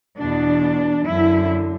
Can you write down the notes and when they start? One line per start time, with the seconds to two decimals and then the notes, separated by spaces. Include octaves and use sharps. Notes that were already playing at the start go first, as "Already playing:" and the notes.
0.18 E2 B2 D4
1.08 F#2 D3 E4